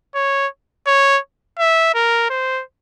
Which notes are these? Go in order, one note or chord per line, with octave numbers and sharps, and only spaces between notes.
C#5
C#5
E5
A#4
C5